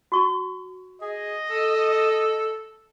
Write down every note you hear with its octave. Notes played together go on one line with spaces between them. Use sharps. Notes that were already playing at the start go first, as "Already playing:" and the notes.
F#4 C#6
G#4 D#5
A4